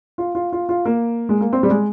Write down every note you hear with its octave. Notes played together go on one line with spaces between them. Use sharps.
F4
F4
F4
F4
A#3
G#3
A#3
C4
G3
G#3